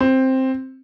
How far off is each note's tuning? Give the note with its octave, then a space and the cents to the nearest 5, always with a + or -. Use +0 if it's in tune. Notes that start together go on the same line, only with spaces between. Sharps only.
C4 +5